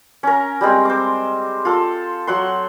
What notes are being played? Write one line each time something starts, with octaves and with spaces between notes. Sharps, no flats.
C#4 A#4
G3 G#3 C4
C5 D6
F4 A4
F#3 F#5 C6